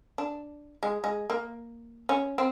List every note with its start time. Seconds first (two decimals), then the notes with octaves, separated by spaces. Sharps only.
0.18 D4
0.83 G#3
1.04 G#3
1.30 A#3
2.09 C#4
2.38 C4